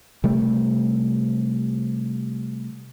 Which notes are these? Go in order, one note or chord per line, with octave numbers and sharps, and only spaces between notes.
C3 G3 A3